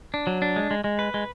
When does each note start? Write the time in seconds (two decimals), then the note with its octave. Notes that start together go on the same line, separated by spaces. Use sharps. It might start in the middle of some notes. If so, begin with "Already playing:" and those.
0.14 D4
0.27 F#3
0.42 D4
0.56 G#3
0.71 G#3
0.84 G#3
0.99 B4
1.14 G#3